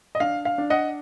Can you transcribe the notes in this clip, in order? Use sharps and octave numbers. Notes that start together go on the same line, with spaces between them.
D#5
D4 F5
F5
D4
D#5 F#5